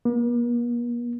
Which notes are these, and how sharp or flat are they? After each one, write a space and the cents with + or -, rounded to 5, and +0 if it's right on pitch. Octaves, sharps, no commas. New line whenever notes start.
A#3 +45